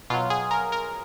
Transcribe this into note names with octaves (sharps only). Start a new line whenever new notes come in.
B2 F#3 F4
G#4
A#4
A#4